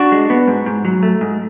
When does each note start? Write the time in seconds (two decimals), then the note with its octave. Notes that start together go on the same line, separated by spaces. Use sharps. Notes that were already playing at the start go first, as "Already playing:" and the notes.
Already playing: D4 F#4
0.12 G#3
0.30 B3
0.47 G#2
0.66 G#2
0.85 F#3
1.03 A3
1.21 G#2